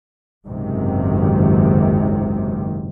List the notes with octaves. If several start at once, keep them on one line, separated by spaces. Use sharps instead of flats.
F#1 C#2 G#2 C3 D#3